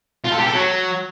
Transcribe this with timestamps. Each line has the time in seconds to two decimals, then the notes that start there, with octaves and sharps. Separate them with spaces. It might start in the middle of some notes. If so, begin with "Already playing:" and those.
0.24 F4
0.32 A4
0.39 G4
0.47 A4
0.54 F#3